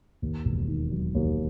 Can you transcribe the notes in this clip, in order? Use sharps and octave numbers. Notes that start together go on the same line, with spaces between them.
D#2
E1
D#3
F#3
D#2